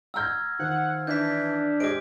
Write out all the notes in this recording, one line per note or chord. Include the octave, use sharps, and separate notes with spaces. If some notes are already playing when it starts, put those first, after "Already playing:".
F#5 A#5 E6 F6 G6 G#6
D#3 F3 F#5
E3 D4 G6 B6
G#3 G4 C5 D6 D7